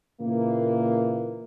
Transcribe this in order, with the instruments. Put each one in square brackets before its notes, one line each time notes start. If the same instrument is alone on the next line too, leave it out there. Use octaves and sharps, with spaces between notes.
[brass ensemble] A#2 C#3 E3 A#3